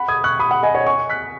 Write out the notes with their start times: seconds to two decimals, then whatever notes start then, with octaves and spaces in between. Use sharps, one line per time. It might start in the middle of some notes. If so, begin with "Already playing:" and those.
Already playing: F#5 B5
0.08 D#6 G#6
0.24 C#6 F#6
0.39 B5 D#6
0.51 F#5 B5
0.63 D#5 G#5
0.74 C#5 F#5
0.86 G#5 C#6
1.10 F#6 B6